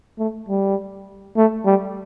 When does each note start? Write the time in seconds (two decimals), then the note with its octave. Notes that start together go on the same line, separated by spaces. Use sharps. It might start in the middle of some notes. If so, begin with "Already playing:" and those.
0.19 A3
0.49 G3
1.37 A3
1.66 G3